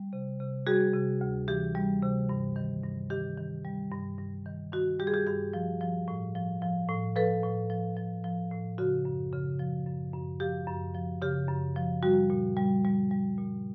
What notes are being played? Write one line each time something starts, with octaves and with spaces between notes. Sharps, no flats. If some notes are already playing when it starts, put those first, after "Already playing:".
Already playing: G3
C3
C3
G3 F#4 G#4
C3
D2
E3 G4
G3
C3
G2
D#3
G2
D#3 G4
D#3
G3
G2
G2
D#3
D#3 F#4
G3 G4
G#4
G4
G2 G4
F3
F3
A2
F3
F3
A2
F3 A4 B4
A2
F3
F3
F3
A2
C#3 F#4
F#2
C#3
F3
F#2
F#2
F3 G4
F#2
F3
C#3 G4
F#2
F3
G3 F#4
A#2
G3
G3
G3
A#2